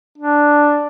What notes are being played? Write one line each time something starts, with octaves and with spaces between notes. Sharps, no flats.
D4